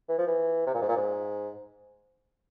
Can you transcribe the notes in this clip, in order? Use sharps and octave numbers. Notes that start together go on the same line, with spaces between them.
E3
F3
E3
C3
A#2
G#2
A#2
G#2